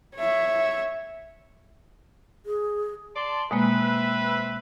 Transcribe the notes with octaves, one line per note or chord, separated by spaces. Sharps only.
C#5 E5
G#4
D5 A5 C6
B2 G#3 A#3 C4 B4 E5